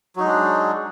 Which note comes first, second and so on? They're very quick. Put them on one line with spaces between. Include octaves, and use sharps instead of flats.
F#3 D#4 G#3 D4